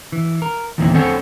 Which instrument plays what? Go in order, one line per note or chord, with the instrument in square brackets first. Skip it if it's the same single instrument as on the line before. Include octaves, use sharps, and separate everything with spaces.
[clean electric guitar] E3
A#4
E2 A#2 D#3 E3 A#3 C4
C4 A4 C5 C#5 F#5 G#5